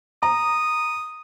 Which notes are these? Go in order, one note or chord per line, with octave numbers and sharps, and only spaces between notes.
A#5 D#6